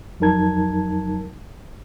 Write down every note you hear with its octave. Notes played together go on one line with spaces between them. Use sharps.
F2 F#3 D#4 A#4 A5 G#6